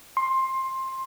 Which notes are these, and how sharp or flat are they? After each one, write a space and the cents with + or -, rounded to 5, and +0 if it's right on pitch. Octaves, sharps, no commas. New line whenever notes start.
C6 +15